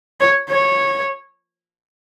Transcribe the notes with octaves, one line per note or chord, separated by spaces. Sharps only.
C#5
C#5